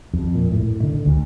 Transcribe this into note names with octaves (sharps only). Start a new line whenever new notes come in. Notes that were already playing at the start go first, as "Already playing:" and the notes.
F2
A#2
A2
D3
D2